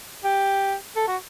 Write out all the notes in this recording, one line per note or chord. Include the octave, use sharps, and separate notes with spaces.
G4
A4
F#4